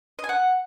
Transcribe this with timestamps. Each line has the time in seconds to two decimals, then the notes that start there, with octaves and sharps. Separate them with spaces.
0.19 D#5
0.24 G#5
0.29 F#5